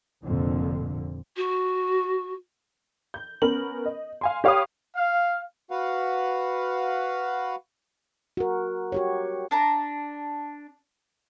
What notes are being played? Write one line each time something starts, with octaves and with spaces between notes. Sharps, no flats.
F1 F2 A#2 D3
F#4
G6
B3 C#4 A#4 F#7
D#5
F5 G#5 C6
G4 C#5 F5 G5 B5 D#6
F5
F#4 B4 F5 F#5
F#4 A#4
F#4 G4 C#5
D4 A5 A#5